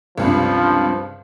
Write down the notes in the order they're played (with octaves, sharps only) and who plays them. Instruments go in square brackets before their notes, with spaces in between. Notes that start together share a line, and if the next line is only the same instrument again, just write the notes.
[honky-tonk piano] C#2 G2 C3 [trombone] F3